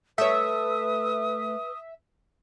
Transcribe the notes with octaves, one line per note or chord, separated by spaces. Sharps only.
A3 B4 C#5 E5 D#6